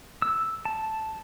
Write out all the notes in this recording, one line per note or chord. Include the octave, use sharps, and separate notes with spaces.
E6
A5